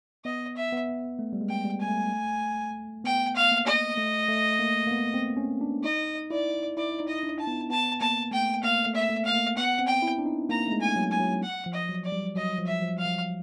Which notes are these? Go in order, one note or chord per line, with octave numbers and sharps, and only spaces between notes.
B3 D#5
E5
B3
A3
G3
G#3
G5
G3
G#5
A3
B3 G5
F5
A#3
D#5
A3
A3
A#3
A#3
B3
C4
C#4
D4
D#4 D#5
E4 D5
E4 D5
D#4
D#5
D4
A5
B3
B3 A5
A#3 A5
A3 G5
A#3 F5
A3
E5
A3
F5
A#3
B3 F#5
C4
G5
E4
D4
D#4
A#3 A#5
A3
G#3
G#5
F#3
G#5
F#3
F#5
F3
D#5
F#3
D5
G3
F#3 D#5
F3
E5
F3
F5
F3